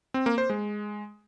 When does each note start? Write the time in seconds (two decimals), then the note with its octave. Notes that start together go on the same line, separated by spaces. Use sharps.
0.14 C4
0.26 A#3
0.38 C5
0.50 G#3